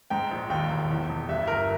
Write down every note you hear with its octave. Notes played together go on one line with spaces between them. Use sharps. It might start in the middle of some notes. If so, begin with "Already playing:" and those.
G#2 G5
A#1
D#2 G5
E1
E2
E1
G2 E5
G1 A#4